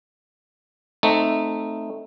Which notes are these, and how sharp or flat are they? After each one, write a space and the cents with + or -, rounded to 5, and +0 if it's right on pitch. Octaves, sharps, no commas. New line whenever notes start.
A3 +0 C4 +0 D#4 -5